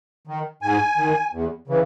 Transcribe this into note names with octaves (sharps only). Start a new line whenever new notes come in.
D#3
G#2 G#5
D#3
E2
C#3 E3